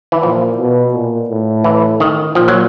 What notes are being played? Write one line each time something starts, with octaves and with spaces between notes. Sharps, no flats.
E3
A#2 F3
B2
A#2
A2
E3
D#3
A#2 F3
F#3